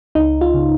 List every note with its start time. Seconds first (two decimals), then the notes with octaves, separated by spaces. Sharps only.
0.15 C#2 D#4
0.41 F4
0.54 C#3